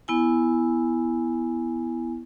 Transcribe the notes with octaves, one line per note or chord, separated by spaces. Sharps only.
B3 E4 G#5